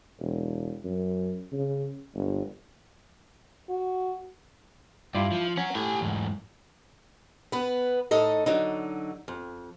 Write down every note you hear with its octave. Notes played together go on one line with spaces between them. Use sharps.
E1
F#2
C#3
G1
F#4
G2 E4 F4 D5
F3
C#4 C#5 F#5
A2 G4 G#5
E2 G#2
B3 B4
A2 D#4 A4 D#5
D3 F#3 D#4
F2